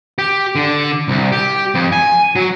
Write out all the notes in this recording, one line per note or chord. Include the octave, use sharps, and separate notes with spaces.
G4
D3
C2
G4
F2
G#5
F#3